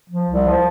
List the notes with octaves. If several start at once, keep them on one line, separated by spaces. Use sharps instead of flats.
F3
C2
F3